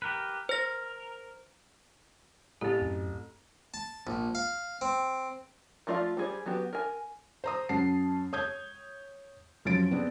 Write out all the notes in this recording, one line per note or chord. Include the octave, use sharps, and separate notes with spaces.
G4 A#4 B4
A#4 C5 A#6
A1 C4 G4
F#2
A5
A#1
F5
C4
F3 A3 F4 D5 F5
G3 G#4 C5
F#3 B3 F#4 G4
A#4 G#5
C5 A#5 D#6
F#2 C#4 F#5 A5 C7
C#5 D#6 G6 G#6
F#2 F3 F#3 C#4 A6 D7
B3 C4 D4 G#4